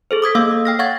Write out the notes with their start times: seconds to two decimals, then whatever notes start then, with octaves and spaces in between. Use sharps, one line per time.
0.11 G#4 A4 C5
0.22 D6 D#6 G#6 B6
0.35 A#3 A4 F5 E6
0.51 D#6
0.65 G5 F6 A#6
0.79 C#5 F5 F#5 C#6 G#6 A6